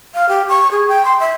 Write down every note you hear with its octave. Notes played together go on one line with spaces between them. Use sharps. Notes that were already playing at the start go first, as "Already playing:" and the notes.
F5
G4
C#6
G#4
G5
C6
E5